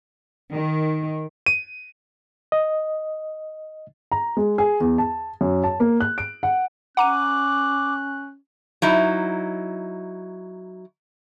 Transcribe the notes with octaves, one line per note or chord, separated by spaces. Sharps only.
D#3
D#7
D#5
A#5
G#3
G#4
E2
A5
F#2
A5
A#3
F#6
D7
F#5
C#4 F#5 A#5 D6 F#6 D#7
F#3 D#4 E4